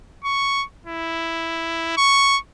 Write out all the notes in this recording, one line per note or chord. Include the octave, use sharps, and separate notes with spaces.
C#6
E4
C#6